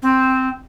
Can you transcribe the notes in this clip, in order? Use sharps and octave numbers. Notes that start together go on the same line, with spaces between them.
C4